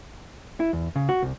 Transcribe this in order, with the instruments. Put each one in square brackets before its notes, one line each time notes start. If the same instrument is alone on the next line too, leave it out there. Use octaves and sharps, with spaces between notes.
[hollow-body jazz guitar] E4
E2
C#3
F#4
C2